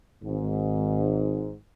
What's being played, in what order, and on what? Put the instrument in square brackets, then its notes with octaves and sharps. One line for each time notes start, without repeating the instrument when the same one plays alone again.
[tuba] G#1 [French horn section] G#2